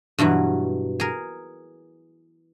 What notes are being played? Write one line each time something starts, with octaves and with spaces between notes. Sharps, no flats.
G2 B2 E3 F#3
G#4 A#4